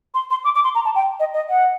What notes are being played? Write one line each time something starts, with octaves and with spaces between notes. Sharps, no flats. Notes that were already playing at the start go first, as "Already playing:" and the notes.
C6
C6
D6
D6
C6
A#5
A5
G5
D#5
D#5
F#5